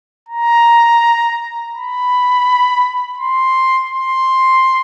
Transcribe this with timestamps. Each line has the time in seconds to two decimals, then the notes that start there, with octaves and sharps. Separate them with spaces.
0.29 A#5
1.73 B5
3.17 C6
3.89 C6